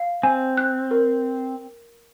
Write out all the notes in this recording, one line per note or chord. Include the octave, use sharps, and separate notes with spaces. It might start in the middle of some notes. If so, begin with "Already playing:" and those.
Already playing: F5
C4 G#5
F#6
A#4